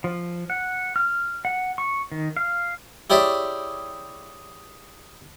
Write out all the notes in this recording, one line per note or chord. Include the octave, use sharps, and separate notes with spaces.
F3
F#5
F6
F#5
C#6
D#3
F5
E4 G4 G#4 C#5 D5 E5